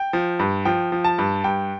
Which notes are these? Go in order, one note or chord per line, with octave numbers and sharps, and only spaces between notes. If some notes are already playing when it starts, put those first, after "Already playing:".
Already playing: G5
F3
G2
F3 G5
F3
A5
G2
G2 G5